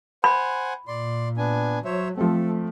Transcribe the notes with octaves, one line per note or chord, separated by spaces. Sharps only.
C5 F#5 G#5 B5
A#2 D5 C6
B3 D4 G#5
F#3 C5 C#5 E5
F3 A3 C4 A4